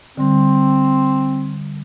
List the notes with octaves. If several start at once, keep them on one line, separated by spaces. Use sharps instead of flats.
D3 G3 C4